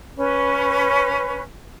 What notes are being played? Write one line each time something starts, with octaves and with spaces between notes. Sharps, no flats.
C#4 B4